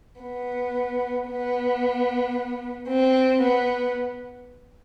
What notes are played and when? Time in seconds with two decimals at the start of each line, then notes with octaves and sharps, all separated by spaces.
0.21 B3
1.28 B3
2.88 C4
3.42 B3